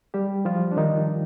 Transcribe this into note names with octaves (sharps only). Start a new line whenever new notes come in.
G3 G4
F3 F4
D4
D#3 D#4